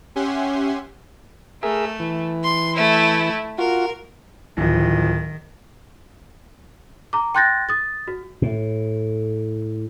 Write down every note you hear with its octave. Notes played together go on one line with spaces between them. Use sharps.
C#4 G4 E5 F#5 G#5 C6
A3 G#4 A#4 E5
E3
C6
A3 E4
F4 F#4 A#4
D1 D#3 F3
A#5 D6
G5 C6 F#6 G6 A6 A#6
D#6 A6
F#4
A2